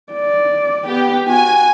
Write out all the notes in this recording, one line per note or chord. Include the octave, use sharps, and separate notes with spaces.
D5
B3 G4
F#4 G#5